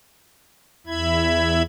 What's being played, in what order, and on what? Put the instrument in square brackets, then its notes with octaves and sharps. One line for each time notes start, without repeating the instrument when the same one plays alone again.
[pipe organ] E2 E4 E5 B5 G#6